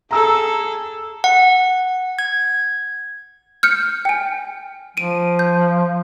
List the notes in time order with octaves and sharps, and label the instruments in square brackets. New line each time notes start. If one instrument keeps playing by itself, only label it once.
[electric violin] G#4 A4 [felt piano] A#5 E6
[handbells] F#5
G#6
[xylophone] F6 G6 C#7
G5 G#5
[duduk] F3 [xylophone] D7 D#7
[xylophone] G6